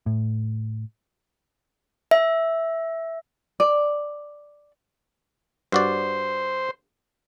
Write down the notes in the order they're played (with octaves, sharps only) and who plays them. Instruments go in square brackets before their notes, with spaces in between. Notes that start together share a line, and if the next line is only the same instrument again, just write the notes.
[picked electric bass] A2
[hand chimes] E5
[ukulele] D5
[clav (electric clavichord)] G2 F#4 D5 [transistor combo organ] C5